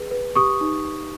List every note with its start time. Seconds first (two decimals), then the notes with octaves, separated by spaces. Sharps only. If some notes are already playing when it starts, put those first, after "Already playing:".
Already playing: G#4 B4
0.11 B4
0.35 G4 C#6 D#6
0.61 D#4